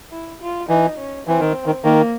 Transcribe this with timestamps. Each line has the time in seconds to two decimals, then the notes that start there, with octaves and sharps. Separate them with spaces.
0.12 E4
0.41 F4
0.69 E3 D#4
0.98 C#4
1.27 E3 C4
1.40 D#3
1.66 D#3
1.84 D#3 A#3